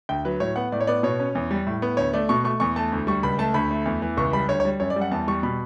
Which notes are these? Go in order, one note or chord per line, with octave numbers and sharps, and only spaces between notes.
D2 G5
F#3 B4
A2 C#5
B3 F#5
A2 D5
C#5
B3 D5
B2 C#5
C#4
E2
G3
A2
B3
D2 C#5
A3 D5
B2 C#6
A3 C#6
E2 C#6
A3 A5
D2
G3 C#6
C#2 B5
A3 A5
D2 B5
A3
E2
E3
C#2 C#6
G3 B5
D2 C#5
C#5
G3
F#2 C#5
D5
G3
F#5
E2 A5
G3 C#6
B2 B5